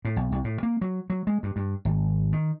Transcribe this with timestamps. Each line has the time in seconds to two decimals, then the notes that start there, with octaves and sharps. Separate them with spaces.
0.05 A2
0.16 B1
0.32 C2
0.44 A2
0.63 A#3
0.81 F#3
1.10 F#3
1.27 G#3
1.43 G2
1.56 G2
1.85 G#1
2.33 D#3